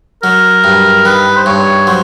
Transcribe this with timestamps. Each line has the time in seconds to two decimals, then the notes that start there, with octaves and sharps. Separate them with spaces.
0.23 F#3 A#4
0.64 G2
1.05 D#3 B4
1.36 C5
1.46 G2 C#5
1.87 F#3 C5